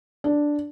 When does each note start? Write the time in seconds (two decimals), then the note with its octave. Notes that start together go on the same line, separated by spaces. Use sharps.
0.24 D4